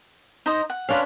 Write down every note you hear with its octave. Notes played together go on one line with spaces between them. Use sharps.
D#4 C5 D#5
F#5
C#4 D4 B4 F5 C6